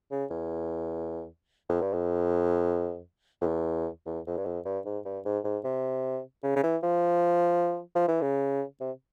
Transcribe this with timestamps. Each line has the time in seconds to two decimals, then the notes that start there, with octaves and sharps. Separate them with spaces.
0.11 C#3
0.30 E2
1.69 F2
1.81 G2
1.93 F2
3.41 F2
3.47 E2
4.06 E2
4.26 F2
4.37 G2
4.46 F2
4.65 G2
4.85 G#2
5.05 G2
5.25 G#2
5.44 G#2
5.64 C3
6.43 C#3
6.56 C#3
6.63 E3
6.83 F3
7.95 F3
8.08 E3
8.21 C#3
8.80 C3